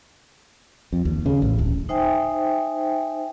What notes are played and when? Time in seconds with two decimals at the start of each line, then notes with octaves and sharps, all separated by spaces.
0.93 F2
1.05 D#2
1.26 C#3
1.42 A1
1.59 D1
1.89 D#4 C5 E5 G5 G#5